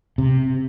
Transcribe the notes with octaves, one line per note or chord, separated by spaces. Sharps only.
C3